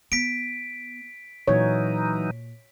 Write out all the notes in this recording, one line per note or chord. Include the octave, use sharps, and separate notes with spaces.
B3 B6 D7
A#2 E3 F#3 D#4 C#5